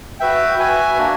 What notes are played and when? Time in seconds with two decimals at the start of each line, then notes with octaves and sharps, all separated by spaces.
0.20 F#4 B4 E5 G5
0.58 F#4 B4 E5 G#5
0.98 A#3 D4 F#4